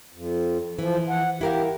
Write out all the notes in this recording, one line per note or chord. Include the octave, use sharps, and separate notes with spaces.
F2
E3 F3
F#5
E4 G4 A#4 F5